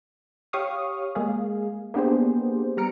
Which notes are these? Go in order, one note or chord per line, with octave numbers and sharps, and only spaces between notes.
G4 C#5 F5 C#6 D#6 F6
G#3 A#3 G#4 F5
A#3 B3 D4 G4 G#4 C5
G3 B3 A#5 F6 C#7 D7